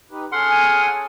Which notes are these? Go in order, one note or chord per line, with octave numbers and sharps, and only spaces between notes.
D#4 G4 B4
C#4 G#4 A4 F#5 C6 F6
G#5